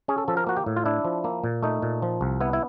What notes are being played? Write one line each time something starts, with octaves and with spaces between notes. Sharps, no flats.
C#4 G#4
A4
F3 A4
A#4
A#3 F#4
G4
A2
F4
D4 E4
F3
A#3
A#2
A3 D#4
A#2
F3
C2
B3 E4
E4